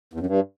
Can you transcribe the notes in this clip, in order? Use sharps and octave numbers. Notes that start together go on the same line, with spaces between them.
E2
F#2
G2